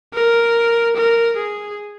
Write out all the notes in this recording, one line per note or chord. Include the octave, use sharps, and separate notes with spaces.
A#4
A#4
G#4